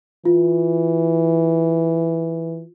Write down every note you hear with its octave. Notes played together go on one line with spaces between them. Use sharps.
E3 F4